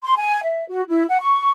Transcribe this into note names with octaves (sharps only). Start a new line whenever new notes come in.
C6
G#5
E5
F#4
E4
F#5
C#6